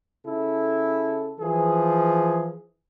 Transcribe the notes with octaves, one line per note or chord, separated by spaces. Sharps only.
C#3 E4 A4
E3 F3 G#4